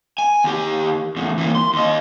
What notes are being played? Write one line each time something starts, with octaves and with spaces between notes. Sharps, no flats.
G#5
D#2 G4
E2 A2
E3 A#3
C6
D#2 D#5